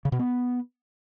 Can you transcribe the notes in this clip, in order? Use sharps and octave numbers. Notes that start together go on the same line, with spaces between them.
C#3
B2
B3